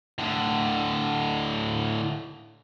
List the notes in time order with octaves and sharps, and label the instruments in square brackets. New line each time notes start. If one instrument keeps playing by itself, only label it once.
[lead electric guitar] A2 D3